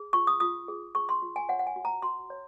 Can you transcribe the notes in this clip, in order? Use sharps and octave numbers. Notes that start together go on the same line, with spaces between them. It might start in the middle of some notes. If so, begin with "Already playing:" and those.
Already playing: G#4
F4 C#6
D#6
F4 D#6
G#4
G#4 C#6
C6
F4
G#5
C#5 F#5
F#5
G#5
F#4
A#5
F#4 C6
C#5